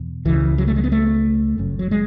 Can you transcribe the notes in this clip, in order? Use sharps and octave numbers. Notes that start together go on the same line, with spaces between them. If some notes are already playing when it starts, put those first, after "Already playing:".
Already playing: E2 B2
C#2 C#3 E3
F#3
A3
G#3
B3
A3
F#1 F#2 C#3
F#3
G#3